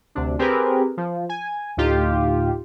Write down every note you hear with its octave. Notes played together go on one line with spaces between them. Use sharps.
D2 C3 D4
C4 G4 G#4 A#4 B4
F3
G#5
D2 A2 D#4 F4 G4